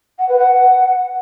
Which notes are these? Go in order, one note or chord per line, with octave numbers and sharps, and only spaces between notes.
F#5
B4
F#5